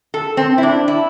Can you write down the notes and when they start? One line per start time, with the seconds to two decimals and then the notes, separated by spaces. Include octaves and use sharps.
0.14 A4
0.37 C4
0.58 E4
0.63 D4
0.88 E4